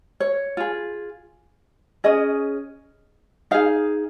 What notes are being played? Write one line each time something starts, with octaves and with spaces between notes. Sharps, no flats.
C#5
F4 G#4
C#4 G#4 D#5
D#4 G#4 F5